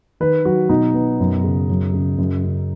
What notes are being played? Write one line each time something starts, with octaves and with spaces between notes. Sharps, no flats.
D#3 B4
F#3 F#4
B2 D#4
B3
F#2
C#3
F#2
C#3
F#2
C#3